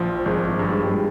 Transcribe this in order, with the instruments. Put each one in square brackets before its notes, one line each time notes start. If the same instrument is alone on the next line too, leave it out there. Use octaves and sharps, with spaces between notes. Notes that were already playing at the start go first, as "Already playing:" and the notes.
Already playing: [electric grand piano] A#1 F3
[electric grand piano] G#1 [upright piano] G#3
[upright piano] G#3
[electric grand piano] G2
[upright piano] G#3
G3
G#3